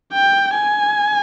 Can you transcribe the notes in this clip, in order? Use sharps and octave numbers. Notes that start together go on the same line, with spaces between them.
G5
G#5